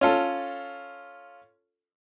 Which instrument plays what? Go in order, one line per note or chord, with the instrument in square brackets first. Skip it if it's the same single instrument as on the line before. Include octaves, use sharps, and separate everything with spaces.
[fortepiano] C#4 F4 A4